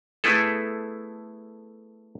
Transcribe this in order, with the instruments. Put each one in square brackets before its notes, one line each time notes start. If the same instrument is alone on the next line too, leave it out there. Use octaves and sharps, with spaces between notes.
[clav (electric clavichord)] A3 B3 E4 G#4 A4